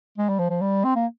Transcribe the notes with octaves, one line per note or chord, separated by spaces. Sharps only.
G#3
G3
F3
F3
G3
C4
A#3